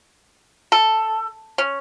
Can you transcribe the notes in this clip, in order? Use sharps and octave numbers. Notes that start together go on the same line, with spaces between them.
A4
C#4